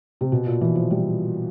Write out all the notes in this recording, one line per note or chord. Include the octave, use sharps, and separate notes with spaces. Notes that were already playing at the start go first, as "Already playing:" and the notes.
C3
B2
A#2
E3
F3
G3